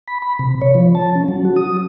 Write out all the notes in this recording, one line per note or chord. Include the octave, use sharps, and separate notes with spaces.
B5
B5
C3
C#5
F3
A5
C#4
F#3
F#4
D#6